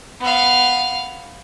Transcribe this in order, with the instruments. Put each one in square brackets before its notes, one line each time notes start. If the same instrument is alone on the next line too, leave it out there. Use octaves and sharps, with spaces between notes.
[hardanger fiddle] B3 F5